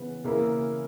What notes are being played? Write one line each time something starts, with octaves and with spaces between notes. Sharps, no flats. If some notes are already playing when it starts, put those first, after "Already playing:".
Already playing: C#3 E3 B3 B4
C#3 E3 A#3 E4 A#4